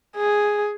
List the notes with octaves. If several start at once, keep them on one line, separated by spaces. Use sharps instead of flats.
G#4